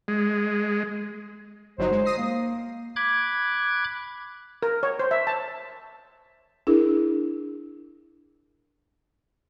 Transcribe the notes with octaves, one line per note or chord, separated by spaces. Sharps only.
G#3
G1 F#3 D#4 C5
G#3
D#6 A#6 C7
A#3
B5 D6 F#6 G#6
A#4
C#5
C5
E5
A5
D4 E4 G#4 A#4